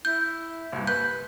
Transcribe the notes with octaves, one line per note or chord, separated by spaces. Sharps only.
E4 G6
C2 G2 A#3
B4 G6